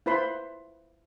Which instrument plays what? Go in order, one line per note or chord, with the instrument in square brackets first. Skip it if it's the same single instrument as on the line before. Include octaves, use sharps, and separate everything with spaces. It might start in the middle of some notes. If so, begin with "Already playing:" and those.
[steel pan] E4 F4 B4 C5 B5 C6